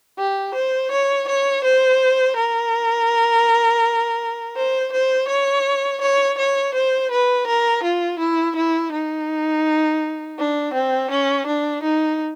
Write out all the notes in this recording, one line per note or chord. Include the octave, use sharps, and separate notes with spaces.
G4
C5
C#5
C#5
C5
A#4
C5
C5
C#5
C#5
C#5
C5
B4
A#4
F4
E4
E4
D#4
D4
C4
C#4
D4
D#4